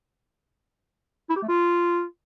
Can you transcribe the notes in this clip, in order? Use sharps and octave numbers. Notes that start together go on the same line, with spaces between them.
E4
G4
A3
F4